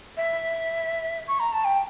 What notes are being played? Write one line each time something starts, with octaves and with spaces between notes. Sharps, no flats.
E5
C#6
A#5
A5
G5